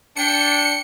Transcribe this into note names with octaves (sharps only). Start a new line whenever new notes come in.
D4 G5 C#7